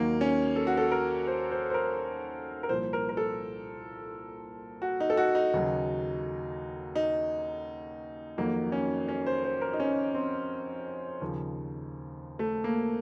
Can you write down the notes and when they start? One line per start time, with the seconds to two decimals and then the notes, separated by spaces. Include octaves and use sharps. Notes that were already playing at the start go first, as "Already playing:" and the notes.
Already playing: D#2 D#3 F#3 A#3
0.21 C#4
0.56 A4
0.67 F#4
0.77 A4
0.92 A#4
1.27 C5
1.51 C5
1.70 C5
1.74 A#4
2.63 A#4
2.69 C2 A#2 F3 C5
2.93 A#4
3.09 A#4
3.17 A4
4.82 F#4
5.00 D#4
5.10 A4
5.17 F#4
5.35 D#4
5.54 D#2 C#3 F#3
6.95 D#4
8.38 F2 D#3 F#3 A#3
8.72 C#4
9.08 C#4
9.26 C5
9.44 C5
9.61 A#4
9.73 D#4
9.80 C#4
10.14 C4
11.21 D#2 C#3 F3
12.39 A3
12.64 A#3